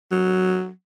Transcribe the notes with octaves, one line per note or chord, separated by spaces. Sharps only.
F#3